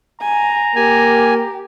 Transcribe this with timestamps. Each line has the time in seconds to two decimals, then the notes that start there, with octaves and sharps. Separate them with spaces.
0.22 G#5 A#5
0.76 A#3 G4 G#5